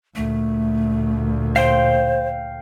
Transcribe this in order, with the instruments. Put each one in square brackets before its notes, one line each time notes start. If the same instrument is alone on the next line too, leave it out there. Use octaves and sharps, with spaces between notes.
[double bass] D2 A#2 [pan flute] A3
[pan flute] C5 [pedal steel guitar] F5 G5 C6